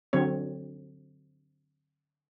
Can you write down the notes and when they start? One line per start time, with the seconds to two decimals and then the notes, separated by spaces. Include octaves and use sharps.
0.13 D3 F#3 C4 C#5